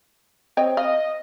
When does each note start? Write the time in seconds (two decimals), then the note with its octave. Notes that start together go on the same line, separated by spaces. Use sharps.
0.57 C4 C#5 D#5 G5
0.77 D#5 F5